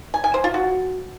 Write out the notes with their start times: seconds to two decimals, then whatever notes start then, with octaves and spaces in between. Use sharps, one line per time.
0.14 G#5
0.24 G#5
0.34 C5
0.44 F4
0.54 F#4